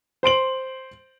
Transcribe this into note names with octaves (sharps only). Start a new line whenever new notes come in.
C5 C6 D7 F#7